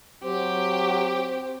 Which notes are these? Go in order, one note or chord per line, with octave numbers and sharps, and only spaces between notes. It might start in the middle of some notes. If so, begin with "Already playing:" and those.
F#3 C4 G4